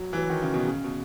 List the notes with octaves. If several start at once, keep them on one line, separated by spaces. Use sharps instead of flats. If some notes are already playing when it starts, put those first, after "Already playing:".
Already playing: F#3
E3
F#3
D#3
C#3
B2
C#3
B2